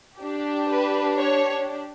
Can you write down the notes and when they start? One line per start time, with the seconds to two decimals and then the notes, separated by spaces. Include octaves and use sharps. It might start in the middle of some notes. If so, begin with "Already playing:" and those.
0.18 D4 G4
0.68 B4
1.18 C#5